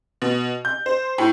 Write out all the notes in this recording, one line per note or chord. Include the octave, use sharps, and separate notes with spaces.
B2
G6
C5
A2